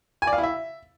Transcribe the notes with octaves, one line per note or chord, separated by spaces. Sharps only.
G#5
D5
F5
E4
E5